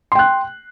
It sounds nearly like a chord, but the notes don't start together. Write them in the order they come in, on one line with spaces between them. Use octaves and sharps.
C6 G5 F#6